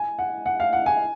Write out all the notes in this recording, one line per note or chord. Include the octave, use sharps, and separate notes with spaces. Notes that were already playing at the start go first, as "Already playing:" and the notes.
Already playing: G#5
F#5
F#5
F5
F#5
G#5